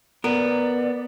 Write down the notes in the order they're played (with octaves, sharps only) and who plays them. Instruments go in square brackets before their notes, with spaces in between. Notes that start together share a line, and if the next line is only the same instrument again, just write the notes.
[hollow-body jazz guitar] B3 A#4 [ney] D5